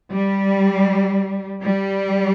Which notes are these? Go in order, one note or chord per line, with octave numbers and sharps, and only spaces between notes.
G3
G3